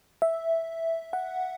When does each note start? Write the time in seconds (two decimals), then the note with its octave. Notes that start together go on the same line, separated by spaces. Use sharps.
0.22 E5
1.13 F#5